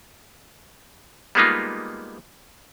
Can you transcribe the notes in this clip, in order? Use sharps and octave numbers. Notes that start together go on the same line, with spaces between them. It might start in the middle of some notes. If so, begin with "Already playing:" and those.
G3 G#3 A#3 B3 D#4 F4